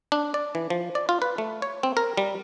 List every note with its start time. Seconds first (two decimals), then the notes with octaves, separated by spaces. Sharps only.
0.12 D4
0.34 D5
0.55 E3
0.70 F3
0.95 D5
1.09 F4
1.22 B4
1.38 A3
1.62 C#5
1.83 C4
1.97 A#4
2.17 G3